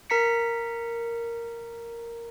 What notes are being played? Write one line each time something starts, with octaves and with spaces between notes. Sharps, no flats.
A#4 A#5 B6 C#7